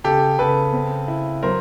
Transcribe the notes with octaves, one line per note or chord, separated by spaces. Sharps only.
C#3 G4 A4
C#3 A4 B4
C4
E4
F#3 A#4 C5